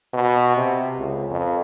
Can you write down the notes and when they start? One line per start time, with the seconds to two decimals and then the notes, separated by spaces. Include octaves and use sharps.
0.14 B2
0.57 C3
0.99 C#2
1.30 F2